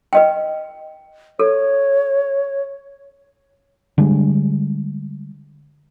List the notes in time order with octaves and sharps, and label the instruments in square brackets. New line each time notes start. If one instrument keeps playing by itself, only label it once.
[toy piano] B4 D#5 G5
[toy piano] A4 [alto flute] C#5
[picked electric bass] D3 G3 G#3